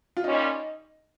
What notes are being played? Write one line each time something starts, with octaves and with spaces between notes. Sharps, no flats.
F4
A#2 G3 C#4 D#4